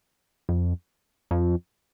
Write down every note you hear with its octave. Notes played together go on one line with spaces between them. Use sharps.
F2
F2